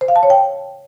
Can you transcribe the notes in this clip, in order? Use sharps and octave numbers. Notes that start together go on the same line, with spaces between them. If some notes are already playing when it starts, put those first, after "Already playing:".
C5
F5
A5
C#5
G5